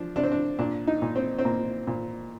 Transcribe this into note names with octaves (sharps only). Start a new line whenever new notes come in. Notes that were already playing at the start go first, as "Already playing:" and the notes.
Already playing: F3 D4
C3 D4
C4
D4
A#2 D4
D#4
A#2
C4
C4
A#2 A#3
A#2